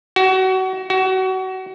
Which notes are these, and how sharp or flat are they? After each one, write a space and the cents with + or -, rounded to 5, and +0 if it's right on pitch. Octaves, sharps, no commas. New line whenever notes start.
F#4 +30
F#4 +30